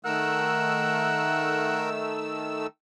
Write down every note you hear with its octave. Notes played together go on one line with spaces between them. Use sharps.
D#3 A3 A#4 F#5 E6